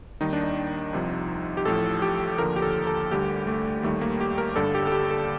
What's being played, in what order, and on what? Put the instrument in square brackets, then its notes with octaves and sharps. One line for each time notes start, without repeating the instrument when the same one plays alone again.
[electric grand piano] D#2 D#3 G3 D#4
D4
D#4
C2 C3 F3
G4
A1 A2 F3 A4
G4
D#2 D3 F3 A#4
G4
A4
A4
D2 D3 G3 G4
A3
D#2 D#3 G3 A3
A#3
G4
A#4
G1 G2 D3 G3 A4
G4
A4
G4
A4